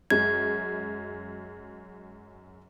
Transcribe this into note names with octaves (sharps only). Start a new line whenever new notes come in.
F#2 G#3 G#6